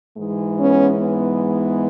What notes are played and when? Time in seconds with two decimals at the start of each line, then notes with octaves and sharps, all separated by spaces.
0.17 G#2 E3 G#3
0.59 B3 C#4
1.02 B3